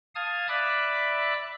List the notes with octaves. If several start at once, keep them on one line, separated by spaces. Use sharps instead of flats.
F5 A5 D#6 F6 G#6
D5 E5 B5 D6 E6 F#6